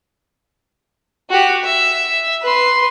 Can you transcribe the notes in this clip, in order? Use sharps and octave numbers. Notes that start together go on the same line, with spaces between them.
F#4 G4
E5
B4 C6